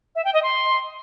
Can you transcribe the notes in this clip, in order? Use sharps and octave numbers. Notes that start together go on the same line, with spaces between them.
E5
G5
D#5
C6